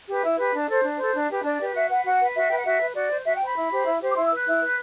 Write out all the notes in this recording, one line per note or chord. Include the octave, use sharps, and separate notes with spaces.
G4 B4
E4
G4 B4
D4
A4 C5
D4
A4 C5
D4
G4 B4
D4 D5
G4 B4
F#4 E5
B4 F#5
F#4 F#5
B4
F#4 E5
B4 G5
F#5
F#4 E5
B4
F#4 D5
C5
F#4 E5
G5
C5 B5
E4
G4 C5
E4
G4 C5
D6
E4 C6
E6
B4
F#6
E4
B4